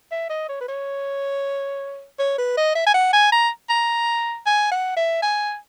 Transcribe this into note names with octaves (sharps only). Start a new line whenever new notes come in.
E5
D#5
C#5
B4
C#5
C#5
B4
D#5
E5
G#5
F#5
G#5
A#5
A#5
G#5
F#5
E5
G#5